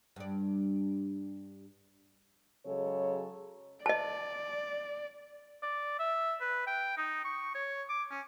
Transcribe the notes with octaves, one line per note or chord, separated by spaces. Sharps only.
G2 D5
C#3 F#3 G#3 A4 C#5
D5 D#5 A5
D5
E5
B4
G5
D#4
C#6
C#5
D6
C#4